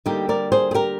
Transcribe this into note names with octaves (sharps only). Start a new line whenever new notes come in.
D2 D3 G3 A#3 D#4 G4
A#4 D5
G#4 C5
G#4
G4 A#4